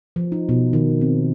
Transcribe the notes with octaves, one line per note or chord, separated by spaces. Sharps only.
F3
D#4
B2
D#3
C4